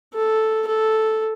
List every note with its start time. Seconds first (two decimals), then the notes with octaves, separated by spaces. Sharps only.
0.14 A4
0.67 A4